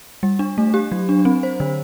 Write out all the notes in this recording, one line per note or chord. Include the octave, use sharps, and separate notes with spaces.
G3
D4
A3
G4
F#3
D4
C4
C5
D3